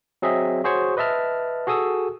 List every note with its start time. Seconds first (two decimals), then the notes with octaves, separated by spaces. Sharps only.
0.22 F#3 C4 G#4 D#5 E5
0.64 F#4 G#4 C5 C#5 C#6
0.97 B4 D#5 E5 A5 F6
1.67 F#4 G#4 A4 D#6 E6